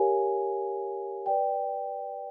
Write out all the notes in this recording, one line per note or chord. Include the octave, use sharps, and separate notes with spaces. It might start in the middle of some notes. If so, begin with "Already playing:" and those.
Already playing: G4 A#4 C#5 F5 G#5
B4 D5 G5